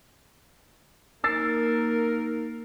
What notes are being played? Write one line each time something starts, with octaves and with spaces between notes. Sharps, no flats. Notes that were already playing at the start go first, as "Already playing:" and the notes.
A#3 D#4 A#4 E6 A6 C7